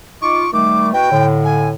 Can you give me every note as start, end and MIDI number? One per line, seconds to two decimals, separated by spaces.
0.22 0.47 63
0.22 0.47 65
0.22 0.51 85
0.22 0.47 86
0.53 0.89 51
0.53 0.89 55
0.53 0.89 57
0.53 0.89 86
0.93 1.09 47
0.93 1.09 64
0.93 1.09 66
0.93 1.26 79
1.11 1.74 45
1.11 1.74 50
1.44 1.69 80